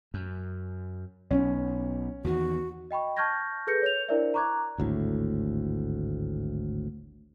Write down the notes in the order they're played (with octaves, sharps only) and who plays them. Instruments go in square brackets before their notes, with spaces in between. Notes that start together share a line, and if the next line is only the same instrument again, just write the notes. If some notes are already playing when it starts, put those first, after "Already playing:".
[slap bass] F#2
[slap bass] B1 [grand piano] C#4
[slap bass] E2 D#3 [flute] F#4
[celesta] D#5 G5 B5 C#6
A5 C#6 F6 G6 G#6 A#6
G#4 A4 B4 G6 A#6 C#7
C#5 G6 F7
D4 E4 A#4 C5 D5 E5
A#5 C#6 D6 F#6 G#6
[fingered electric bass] G#1 D2 A2